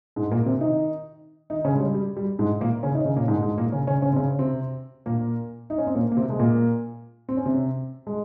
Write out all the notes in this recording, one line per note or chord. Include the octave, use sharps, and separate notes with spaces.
G#2 G#3
A#2 A#3
C3 C4
D#3 D#4
D#3 D#4
C#3 C#4
G#3
G3
G3
G3
G#2 G#3
A#2 A#3
C#3 C#4
D#3 D#4
C#3 C#4
A#2 A#3
G#2 G#3
G#2 G#3
A#2 A#3
C#3 C#4
C#3 C#4
C#3 C#4
C4
C#3 C#4
C3 C4
A#2 A#3
D#4
C#4
C4
A#2 A#3
A#3
C3 C4
G#3
A#2 A#3
C4
C#4
C3 C4
G#3